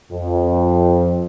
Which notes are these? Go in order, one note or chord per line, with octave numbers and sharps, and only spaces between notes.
F2